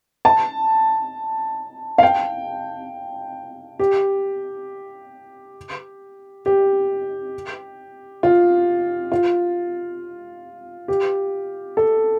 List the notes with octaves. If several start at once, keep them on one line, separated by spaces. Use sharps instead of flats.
A5
F5
G5
G4
G4
F4
F4
G4
A4